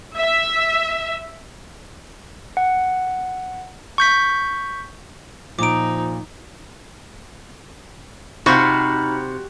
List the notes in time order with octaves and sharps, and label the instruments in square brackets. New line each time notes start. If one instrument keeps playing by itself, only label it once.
[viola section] E5
[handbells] F#5
C#6 G6 B6
[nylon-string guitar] A#2 [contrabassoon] F3 [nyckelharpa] D#4 [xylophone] D6 D7
[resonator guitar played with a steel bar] C3 [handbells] D#4 B5 F6 [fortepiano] F4 C5 C#6 [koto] F#4